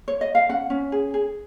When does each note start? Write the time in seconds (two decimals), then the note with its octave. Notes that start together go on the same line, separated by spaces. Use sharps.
0.08 C#5
0.21 D#5
0.35 F5
0.49 C#4 F#5
0.70 C#4
0.92 G#4
1.14 G#4